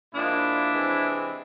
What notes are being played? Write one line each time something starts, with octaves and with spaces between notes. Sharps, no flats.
A#2 F3 G#3 D4 E4
C3 E3 G#3 C4